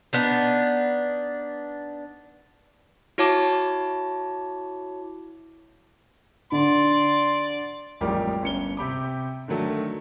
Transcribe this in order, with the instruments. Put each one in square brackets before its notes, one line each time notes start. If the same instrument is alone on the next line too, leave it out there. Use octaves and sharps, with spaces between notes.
[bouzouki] B3 D4 D#4
[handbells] E4 F#4 C#5 A5 D6
[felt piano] D3 [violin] D5 [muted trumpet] C6
[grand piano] A1 F2 G3 G#3 A#4 D6
G1 C#4 C#7 G7
C3 G4 B5 D6
D3 D#3 F#3 A3